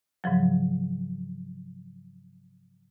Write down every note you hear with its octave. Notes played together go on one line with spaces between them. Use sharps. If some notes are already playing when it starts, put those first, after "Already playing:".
G#2 C#3 F3 F#3